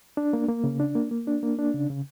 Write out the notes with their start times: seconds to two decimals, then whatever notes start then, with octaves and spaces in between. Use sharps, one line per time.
0.17 D4
0.33 A#3
0.48 A#3
0.64 C#3
0.80 D4
0.95 A#3
1.11 A#3
1.27 D4
1.43 A#3
1.59 D4
1.74 C#3
1.90 C#3